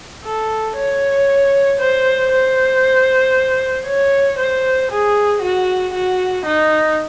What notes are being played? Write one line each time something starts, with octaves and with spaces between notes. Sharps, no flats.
A4
C#5
C5
C5
C#5
C5
G#4
F#4
F#4
D#4